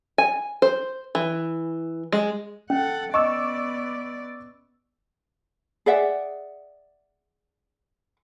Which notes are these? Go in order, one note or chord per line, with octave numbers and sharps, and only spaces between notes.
G#5
C5
E3
G#3
C#4 A4 F#5
B3 D5 D#5 C#6 D6 E6
G#4 D5 E5 F#5